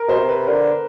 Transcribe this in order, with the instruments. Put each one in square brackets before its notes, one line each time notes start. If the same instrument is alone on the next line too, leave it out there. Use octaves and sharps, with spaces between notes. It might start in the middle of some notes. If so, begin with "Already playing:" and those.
Already playing: [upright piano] A#4
[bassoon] B2 [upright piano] C5
[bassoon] C3
[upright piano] B4
[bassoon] D3 [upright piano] A#4